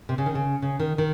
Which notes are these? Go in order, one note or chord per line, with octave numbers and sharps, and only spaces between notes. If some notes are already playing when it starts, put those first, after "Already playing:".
C3
C#3
D#3
C#3
C#3
D#3
D#3